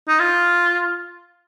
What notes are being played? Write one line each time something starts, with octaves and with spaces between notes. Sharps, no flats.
D#4
F4